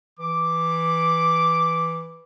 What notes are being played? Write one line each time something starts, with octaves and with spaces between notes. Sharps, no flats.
E3 D6